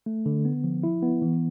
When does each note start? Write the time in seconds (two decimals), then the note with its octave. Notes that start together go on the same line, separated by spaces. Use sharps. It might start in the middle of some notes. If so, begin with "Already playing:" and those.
0.06 A3
0.26 D3
0.45 B3
0.64 F3
0.83 E4
1.03 B3
1.22 E3